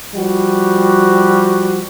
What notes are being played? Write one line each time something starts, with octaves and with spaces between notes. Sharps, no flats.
F3 G3 F#4